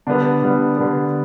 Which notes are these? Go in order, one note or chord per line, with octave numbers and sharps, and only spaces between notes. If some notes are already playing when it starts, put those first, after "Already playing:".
D3 G3 B3 D4
D3 G3 B3
D3 G3 B3